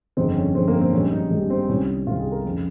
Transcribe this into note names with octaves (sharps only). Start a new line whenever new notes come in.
G1 F2 D#3 G#3 C4
C#4
G1 F2 D#3 G#3 C4
A#3
C4
A#1 G#2 D#3 G3 C#4
D#4
A#1 G#2 D#3 G3
C4
C2 C3 D#3 C#4
C2 C3 D#3 F4
G#4
A#4
F2 C#3 G#3